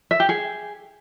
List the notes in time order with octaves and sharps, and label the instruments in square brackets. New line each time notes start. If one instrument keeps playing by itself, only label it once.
[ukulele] E5
G4
G#4